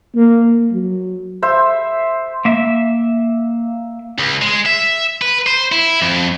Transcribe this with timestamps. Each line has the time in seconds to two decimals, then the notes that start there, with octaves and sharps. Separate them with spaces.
0.15 A#3
0.72 F#3
1.42 C5 E5
2.45 A#3 E5
4.18 C#2
4.42 G#3
4.66 E5
5.21 B4
5.47 C5
5.72 E4
6.02 F2